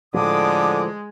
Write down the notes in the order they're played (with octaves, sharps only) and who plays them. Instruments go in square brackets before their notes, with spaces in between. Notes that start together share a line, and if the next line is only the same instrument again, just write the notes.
[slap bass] A2 F3 [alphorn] D3 [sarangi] G#3 [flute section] D6 D#6